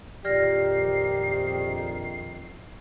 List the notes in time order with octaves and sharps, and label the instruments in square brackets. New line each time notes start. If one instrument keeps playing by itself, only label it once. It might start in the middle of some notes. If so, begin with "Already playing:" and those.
[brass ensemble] A#1 F2 D#3 [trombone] G4 [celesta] D5 F6 A#6 [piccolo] C7